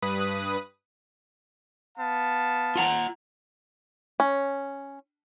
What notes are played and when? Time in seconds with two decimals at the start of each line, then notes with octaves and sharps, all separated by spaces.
0.02 G2 B4 B5 D#6
1.97 B3 F5 A5
2.76 F4 F#5 A#5
4.20 C#4